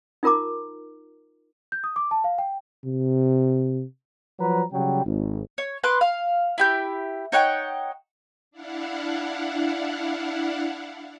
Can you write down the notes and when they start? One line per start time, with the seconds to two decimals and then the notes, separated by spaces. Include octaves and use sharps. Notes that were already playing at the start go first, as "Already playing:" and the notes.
0.23 D#4 F4 A#4 A#5 D6
1.72 G6
1.84 D#6
1.96 D6
2.11 A5
2.24 F5
2.38 G5
2.85 C3
4.39 F3 F#3 B4 C5 A#5
4.73 C#3 F#3 G3 G5
5.05 G#1
5.58 C#5
5.83 B4 C6 D6 F#6
6.01 F5
6.58 E4 G4 G6
7.32 D#4 C#5 F#5 G5
8.51 D4 E4 F5 F#5